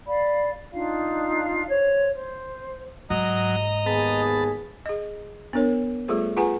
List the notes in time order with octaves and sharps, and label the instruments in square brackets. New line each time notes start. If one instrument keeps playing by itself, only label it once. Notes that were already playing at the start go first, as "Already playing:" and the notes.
[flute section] D5 F5 B5
D4 D#4 F4 F5
C5 C#5
C5
[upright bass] G#2 [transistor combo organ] F#3 [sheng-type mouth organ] D#5 A#5 D#6
[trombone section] D#2 B3 G#4 [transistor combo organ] A5 B5
[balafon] G#4 D#5
B3 D4 A#4 C#5
G3 A3 F4 G#4 A4 C5
F4 G#4 B4 F#5 G#5 A#5